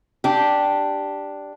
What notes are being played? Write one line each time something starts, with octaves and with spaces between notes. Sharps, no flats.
D4 G4